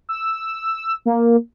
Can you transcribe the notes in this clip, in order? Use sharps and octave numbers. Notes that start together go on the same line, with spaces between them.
E6
A#3